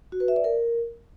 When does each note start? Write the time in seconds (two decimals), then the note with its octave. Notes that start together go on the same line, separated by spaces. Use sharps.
0.12 F#4
0.20 B4
0.28 E5
0.36 D5
0.44 A#4